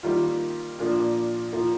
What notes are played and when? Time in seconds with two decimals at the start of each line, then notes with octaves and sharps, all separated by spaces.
0.03 D#3 G3 A#3 F4
0.79 A#2 F3 A#3 D4 F4
1.53 F3 A#3 F4